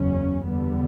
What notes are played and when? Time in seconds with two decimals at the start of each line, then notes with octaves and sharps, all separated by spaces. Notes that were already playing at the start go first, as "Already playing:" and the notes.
Already playing: F#1 E2 C#3 F#3 C#4
0.47 E2 D3 G3 B3